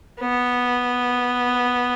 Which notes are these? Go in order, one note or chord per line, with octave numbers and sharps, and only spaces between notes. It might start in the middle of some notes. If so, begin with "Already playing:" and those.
B3